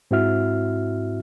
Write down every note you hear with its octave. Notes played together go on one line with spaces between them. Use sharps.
G#2 C4 E4 F#4 E5 F6